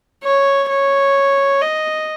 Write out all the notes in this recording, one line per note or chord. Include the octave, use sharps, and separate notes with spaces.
C#5
C#5
D#5